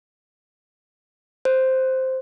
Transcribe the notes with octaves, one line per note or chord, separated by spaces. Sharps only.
C5